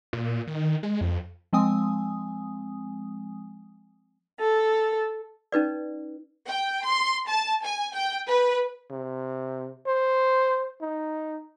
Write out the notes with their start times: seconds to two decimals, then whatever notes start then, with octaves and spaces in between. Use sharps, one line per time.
0.13 A#2
0.47 D#3
0.83 G#3
1.01 F2
1.53 F3 G#3 C4 G#5 D#6
4.39 A4
5.52 C#4 D#4 B4 D5
6.47 G5
6.85 C6
7.28 A5
7.62 G#5
7.93 G5
8.27 B4
8.91 C3
9.87 C5
10.81 D#4